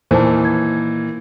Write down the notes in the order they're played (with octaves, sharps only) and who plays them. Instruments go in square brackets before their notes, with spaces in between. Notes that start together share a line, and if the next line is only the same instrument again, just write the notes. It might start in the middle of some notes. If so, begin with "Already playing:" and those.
[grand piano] A#2 D#3 E3 [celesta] C5 A5
[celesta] G#6